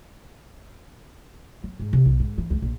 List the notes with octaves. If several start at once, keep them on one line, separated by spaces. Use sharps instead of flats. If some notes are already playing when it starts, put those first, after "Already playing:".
F#3
G#2
C3
B1
G#2
E3
C#2
A#1